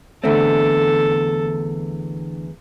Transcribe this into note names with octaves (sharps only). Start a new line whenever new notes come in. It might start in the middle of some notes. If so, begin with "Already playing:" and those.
E2 D3 A3 C4 A4